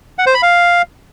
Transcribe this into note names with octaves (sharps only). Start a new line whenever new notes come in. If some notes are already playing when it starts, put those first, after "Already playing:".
F#5
C5
B5
F5